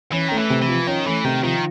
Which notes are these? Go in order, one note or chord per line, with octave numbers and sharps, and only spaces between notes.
E3 C#4
D#3 A3
E3
C3
E3
F3
D#3 C#4
E3 A3
C3 D#3
D#3 F3